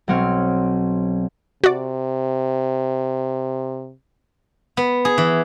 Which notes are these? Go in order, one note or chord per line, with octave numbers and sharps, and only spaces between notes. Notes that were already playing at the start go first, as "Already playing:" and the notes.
B1 F#3 C4 C#5 F6
C3 F#4 D5
B3
G#4
E3